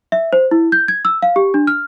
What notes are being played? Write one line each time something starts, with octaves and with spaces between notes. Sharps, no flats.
E5
C5
E4
G6
G#6
E6
F5
G4
D4
F6